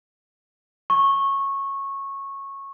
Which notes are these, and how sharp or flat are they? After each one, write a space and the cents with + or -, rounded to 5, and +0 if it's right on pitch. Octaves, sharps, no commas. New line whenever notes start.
C#6 -15